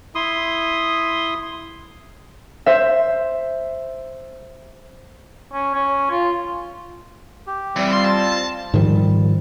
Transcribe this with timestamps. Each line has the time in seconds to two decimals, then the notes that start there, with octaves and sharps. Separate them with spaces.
0.15 E4 C6 D#6
2.66 C5 E5
5.53 C#4
5.74 C#4
6.10 F4
7.47 G4
7.76 E3 G3 C4
7.93 F4 F5 C6
8.05 A5
8.74 G#2 D#3 F3 G3